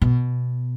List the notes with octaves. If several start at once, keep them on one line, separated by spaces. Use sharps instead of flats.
B2